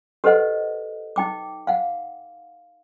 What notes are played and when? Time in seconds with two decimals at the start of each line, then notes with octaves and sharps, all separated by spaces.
0.24 G4 A4 B4 C5 D#5 F#5
1.16 D#4 G5 D6
1.67 F5 F#5